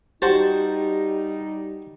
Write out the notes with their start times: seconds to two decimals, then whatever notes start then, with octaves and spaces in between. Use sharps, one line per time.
0.22 G3 D#4 F#4 G4 C5 A5